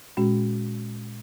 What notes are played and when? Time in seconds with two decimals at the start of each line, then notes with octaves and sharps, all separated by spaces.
0.17 A#2 G#3 C#4 F#4